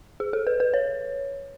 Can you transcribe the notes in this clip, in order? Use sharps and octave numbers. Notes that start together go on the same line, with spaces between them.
G#4
A4
B4
B4
C#5